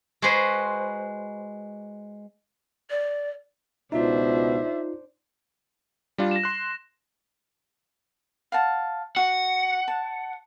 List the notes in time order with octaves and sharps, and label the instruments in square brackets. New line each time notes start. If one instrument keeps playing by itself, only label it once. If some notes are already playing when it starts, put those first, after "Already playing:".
[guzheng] G#3 F#4 G#4 B4 C5
[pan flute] D5
[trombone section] C#2 B2 [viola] D4 C5 [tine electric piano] D#4 F4 [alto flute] E5
[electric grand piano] G3 D4 F4
[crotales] A#6 E7
[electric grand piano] C6 F#6
[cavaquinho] F5 F#5 A5
[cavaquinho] F#4 [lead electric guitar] F#5
[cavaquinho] A5